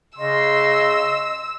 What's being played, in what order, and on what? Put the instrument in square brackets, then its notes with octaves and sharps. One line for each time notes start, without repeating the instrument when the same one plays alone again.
[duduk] C#3 [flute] D#5 [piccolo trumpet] C6 [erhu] E6